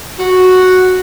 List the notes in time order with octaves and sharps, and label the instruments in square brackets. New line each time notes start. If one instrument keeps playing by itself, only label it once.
[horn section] F#4